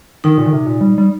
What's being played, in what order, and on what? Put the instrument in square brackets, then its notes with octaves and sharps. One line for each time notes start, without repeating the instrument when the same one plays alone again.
[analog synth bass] D#3 [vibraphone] D#4
[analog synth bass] A#2
D#3
C3
A#2
G3
G3